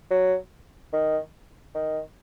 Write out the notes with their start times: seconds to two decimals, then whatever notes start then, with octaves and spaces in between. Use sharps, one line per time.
0.11 F#3
0.93 D#3
1.75 D#3